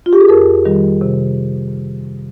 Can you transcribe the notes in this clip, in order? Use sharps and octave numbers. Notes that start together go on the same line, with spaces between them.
F4
G4
G#4
F2 A#4
D#3 G3
C3